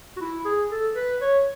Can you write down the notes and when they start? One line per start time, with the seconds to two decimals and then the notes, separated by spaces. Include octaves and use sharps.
0.16 F#4
0.20 E4
0.45 G#4
0.71 A4
0.95 B4
1.21 C#5